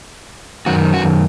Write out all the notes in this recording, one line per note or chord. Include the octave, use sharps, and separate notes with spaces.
F#2 D#3 F#4
F#4